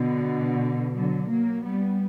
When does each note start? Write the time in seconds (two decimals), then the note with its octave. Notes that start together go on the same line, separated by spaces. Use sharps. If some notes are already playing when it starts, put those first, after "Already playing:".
Already playing: B2 D3
0.95 D3 F#3
1.29 F#3 A#3
1.65 G3 B3